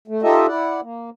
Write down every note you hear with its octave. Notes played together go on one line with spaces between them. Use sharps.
A3
D#4 F4 G4 A4 D#5 E5
E4 D5 F#5
A#3